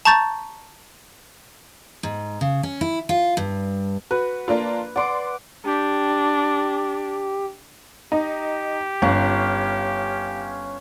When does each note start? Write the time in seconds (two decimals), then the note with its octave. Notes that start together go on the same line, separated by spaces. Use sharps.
0.05 A5 A#5 C#6 G6 A6
2.03 G#2
2.41 C#3
2.63 C#4
2.81 E4
3.09 F4
3.37 G2
4.11 F#4 B4
4.48 A#3 D4 F4
4.96 D5 F#5 C6 D6
5.66 D4 G4
8.12 D#4 G4
9.02 G1 C#4 F5